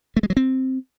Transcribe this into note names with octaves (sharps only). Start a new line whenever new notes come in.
A3
G#3
F#3
C4